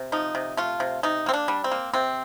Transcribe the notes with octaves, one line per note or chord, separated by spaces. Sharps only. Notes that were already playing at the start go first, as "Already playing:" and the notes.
Already playing: C3
F3 D#4
C3
A3 F4
C3
C3 D#4
A#3 C4
D4
G3
C4
A#3
C3 C4